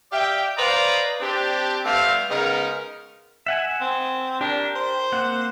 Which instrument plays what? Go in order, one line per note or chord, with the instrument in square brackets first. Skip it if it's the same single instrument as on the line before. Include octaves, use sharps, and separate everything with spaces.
[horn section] G4 D5 E5 F5 G5
B4 C5 D5 D#5 F5 A#5
C4 D4 G4
G3 A3 B3 C4 D4 F5
C#3 G#3 B3 C#4 D#4 A#4
[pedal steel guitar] E5 F#5 G#5
[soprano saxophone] C4
[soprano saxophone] D4 [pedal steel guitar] G4 A#4
[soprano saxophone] C5
[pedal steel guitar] A#3 C4 F#5